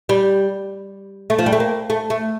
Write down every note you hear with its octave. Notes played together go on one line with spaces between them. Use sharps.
G3
A3
F3
G3
A3
A#3
A3
A3